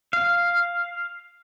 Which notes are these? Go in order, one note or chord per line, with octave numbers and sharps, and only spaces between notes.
F5